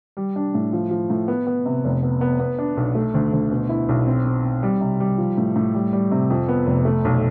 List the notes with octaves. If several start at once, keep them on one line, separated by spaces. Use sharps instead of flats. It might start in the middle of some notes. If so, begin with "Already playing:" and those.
G3
D4
A2
F3
F3
A2
B3
B3
C3
F1
B3
B3
B3
D4
B1
A3
D2
D2
B2
E4
B1
C4
C4
C4
G3
C3
G3
F3
A2
A2
G3
G3
C3
F2
B3
F1
A3
B1